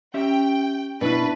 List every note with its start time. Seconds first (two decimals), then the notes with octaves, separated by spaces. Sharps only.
0.14 C#4 G4 E5 G5
1.01 B2 D4 E4 B4